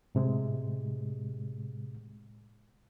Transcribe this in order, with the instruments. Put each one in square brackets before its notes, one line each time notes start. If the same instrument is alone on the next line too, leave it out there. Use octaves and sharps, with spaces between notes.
[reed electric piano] A2 C3 G#3